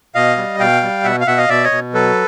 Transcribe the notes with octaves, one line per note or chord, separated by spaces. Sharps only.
B2 D#5 F5
G3
B2 F5 G5
G3
B2 E5 F#5
F5
B2 E5 F#5
D#5 F5
B2 D5 E5
C#5 D#5
B2
F#3 A4 B4